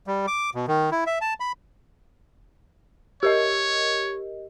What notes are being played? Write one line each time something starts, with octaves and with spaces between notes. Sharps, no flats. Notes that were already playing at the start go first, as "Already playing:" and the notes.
G3
D6
B2
D#3
E4
E5
A5
B5
G4 A#4 C#5 D#5